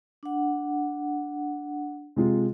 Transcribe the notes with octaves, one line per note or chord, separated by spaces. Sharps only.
D4 F#5
C3 G#3 F4